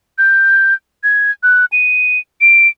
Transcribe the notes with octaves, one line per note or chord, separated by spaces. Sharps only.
G6
G#6
F#6
D#7
D7